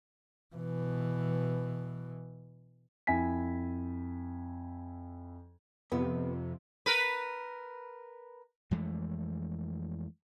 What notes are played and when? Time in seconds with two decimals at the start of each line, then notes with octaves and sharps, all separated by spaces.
0.55 B2 E3
3.07 F2 E4 G#5 B6
5.92 F2 C3 B3
6.86 A#4 B4
8.71 F2 E3 G#3 A3